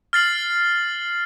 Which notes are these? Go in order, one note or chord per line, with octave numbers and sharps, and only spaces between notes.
F6 A6 C7 F#7